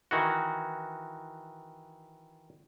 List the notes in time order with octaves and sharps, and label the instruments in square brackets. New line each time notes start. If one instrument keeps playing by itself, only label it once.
[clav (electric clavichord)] D#3 E3 F#4